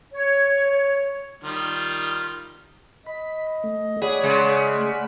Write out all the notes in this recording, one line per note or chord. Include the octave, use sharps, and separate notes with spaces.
C#5
D#3 G3 F4
D#5 B5
A3
G#4 C#5 D5 F#5 B5
C#3 G#3
A3